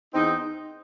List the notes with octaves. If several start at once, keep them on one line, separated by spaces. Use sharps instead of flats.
E2 C4 D#4